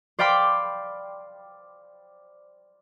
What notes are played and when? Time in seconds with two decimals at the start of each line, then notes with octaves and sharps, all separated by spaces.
0.19 C5 D5 F5 G5 B5 D6